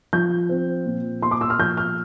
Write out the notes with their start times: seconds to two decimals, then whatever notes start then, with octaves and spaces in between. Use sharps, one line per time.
0.13 F3 G6
0.49 C4
0.86 A#2
1.22 A#2 C6
1.31 D6
1.41 E6
1.50 F6
1.59 F3 G6
1.77 F6